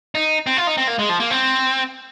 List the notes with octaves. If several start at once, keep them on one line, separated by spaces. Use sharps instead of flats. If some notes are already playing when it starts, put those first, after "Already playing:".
D#4
C4
F4
D#4
C4
A#3
G#3
F3
A#3
C4